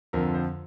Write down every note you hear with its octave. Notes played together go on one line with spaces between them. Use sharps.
F2 D3 F3 A#4
C5